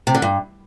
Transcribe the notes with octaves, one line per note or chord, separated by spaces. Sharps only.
C3
D3
G2